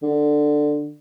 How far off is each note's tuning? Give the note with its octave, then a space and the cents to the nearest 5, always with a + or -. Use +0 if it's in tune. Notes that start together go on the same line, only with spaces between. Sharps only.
D3 +10